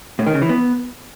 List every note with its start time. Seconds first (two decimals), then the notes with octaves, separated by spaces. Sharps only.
0.19 A2
0.26 D#3
0.34 C#3
0.42 E3
0.49 B3